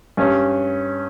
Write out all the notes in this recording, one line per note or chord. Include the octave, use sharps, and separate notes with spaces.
G2 C#4